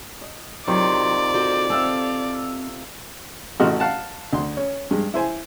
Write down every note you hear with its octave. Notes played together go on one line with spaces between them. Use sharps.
D#5
C3 D#3 F3 F#3 D5
F#4 A4 C5
C4 A4 E5 F5
A1 A3 F#4 D#5 C6 F6
F5 F#5 A5
D2 C6
C#4
G2 G#3
E4 C5 G#5